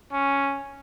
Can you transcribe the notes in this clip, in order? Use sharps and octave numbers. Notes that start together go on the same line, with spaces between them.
C#4